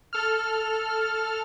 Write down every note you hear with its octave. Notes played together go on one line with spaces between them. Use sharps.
A4 F6